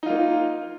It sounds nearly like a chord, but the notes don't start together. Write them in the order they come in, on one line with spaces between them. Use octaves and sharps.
D#4 F4 A#3